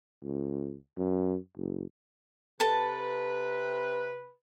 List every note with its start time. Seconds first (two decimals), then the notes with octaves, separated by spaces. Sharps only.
0.23 C#2
0.97 F#2
1.57 F#1
2.60 C3 A4 B4 A5